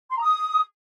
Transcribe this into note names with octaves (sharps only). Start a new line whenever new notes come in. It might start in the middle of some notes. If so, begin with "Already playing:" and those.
C6
A#5
D#6